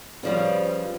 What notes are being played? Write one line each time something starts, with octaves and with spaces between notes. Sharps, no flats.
C#3 F3 G3 B4 D5 F5
B4 C5